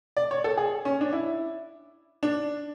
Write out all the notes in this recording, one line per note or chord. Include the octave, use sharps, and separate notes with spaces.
D5
C#5
A4
G#4
C#4
D4
E4
D4